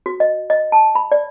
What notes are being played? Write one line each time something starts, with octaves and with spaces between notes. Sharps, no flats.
F#4
D#5
D#5
A5
B5
D5